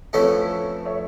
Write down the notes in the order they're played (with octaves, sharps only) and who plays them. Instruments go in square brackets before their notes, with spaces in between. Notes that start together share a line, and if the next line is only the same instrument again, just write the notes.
[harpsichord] F2 E3 A3 C#4 E4 [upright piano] A4 C#5
[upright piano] C#5 E5